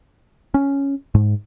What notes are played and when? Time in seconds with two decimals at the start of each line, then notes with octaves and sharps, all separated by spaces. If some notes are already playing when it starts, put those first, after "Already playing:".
0.54 C#4
1.15 G#2